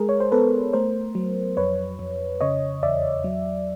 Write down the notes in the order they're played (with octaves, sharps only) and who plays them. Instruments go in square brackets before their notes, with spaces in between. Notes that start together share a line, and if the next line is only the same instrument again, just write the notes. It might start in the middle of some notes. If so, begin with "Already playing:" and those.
Already playing: [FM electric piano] G#3 G#4 A#4
C#5
C5
B3 A4 B4
A3 A#4 C5
F#3
F2 B4 C#5
F2
C#3 C#5 D#5
E2 D5 E5
F#3